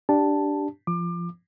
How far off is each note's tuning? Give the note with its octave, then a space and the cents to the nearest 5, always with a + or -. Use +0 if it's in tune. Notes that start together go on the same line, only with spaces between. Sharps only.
D4 +0 G4 +0 A5 +0
F3 -20 D6 +30